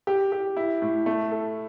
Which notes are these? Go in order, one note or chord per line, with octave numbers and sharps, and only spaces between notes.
G4
G4
E4
A2
A3
A4